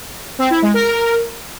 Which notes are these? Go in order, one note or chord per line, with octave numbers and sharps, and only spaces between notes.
C4
E4
G#3
A#4